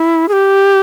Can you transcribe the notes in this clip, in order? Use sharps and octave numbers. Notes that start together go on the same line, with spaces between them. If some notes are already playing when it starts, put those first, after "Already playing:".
Already playing: E4
G#4
G4